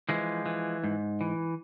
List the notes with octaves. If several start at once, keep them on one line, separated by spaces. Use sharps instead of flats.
E3 F3 G#3
E3
G#2
E3